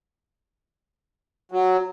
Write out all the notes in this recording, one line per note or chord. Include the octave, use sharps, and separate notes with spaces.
F#3